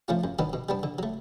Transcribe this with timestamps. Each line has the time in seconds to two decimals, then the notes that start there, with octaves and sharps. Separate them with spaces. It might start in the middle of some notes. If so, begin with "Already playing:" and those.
0.08 F3 A3 C#4 F4
0.24 F#2
0.39 D#3 F#3 B3 D4
0.53 B2
0.69 G3 B3 D4
0.83 D3
0.99 F#3 A3